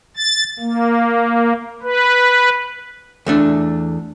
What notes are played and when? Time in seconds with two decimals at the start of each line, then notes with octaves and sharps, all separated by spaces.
0.16 A6
0.60 A#3
1.83 B4
3.26 E2 A3 D4